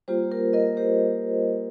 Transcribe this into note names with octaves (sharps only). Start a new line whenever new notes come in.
G3 A#3 F4 G4 C5
A#4
A#4 D#5
G4 C5